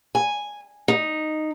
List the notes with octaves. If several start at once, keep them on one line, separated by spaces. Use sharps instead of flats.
G#5
D#4